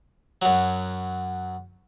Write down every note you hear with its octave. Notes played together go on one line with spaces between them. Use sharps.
F#2 F#3